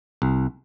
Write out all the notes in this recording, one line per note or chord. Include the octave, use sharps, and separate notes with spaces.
C2